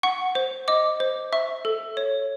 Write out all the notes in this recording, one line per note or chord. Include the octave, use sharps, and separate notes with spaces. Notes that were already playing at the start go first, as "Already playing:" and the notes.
F#5 C#6
C5
D#5 D6
C5
E5 C#6
A4
C#5